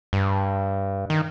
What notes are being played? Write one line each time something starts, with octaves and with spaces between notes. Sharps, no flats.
G2
D#3